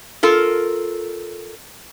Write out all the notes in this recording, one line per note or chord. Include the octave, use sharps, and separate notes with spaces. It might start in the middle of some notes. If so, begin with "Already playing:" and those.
F4 A4 A#4